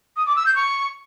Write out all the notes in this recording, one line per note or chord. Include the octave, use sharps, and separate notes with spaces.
D#6
D6
E6
G6
C#6